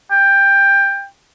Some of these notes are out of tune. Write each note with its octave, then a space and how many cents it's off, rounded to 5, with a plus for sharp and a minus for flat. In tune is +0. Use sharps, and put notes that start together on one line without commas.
G5 +15